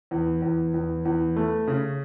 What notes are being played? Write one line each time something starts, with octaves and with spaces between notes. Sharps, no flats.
E2
E2
E2
E2
A3
C#3